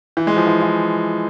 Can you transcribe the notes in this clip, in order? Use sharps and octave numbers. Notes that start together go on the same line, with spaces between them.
E3
G#3
F3
E3
E3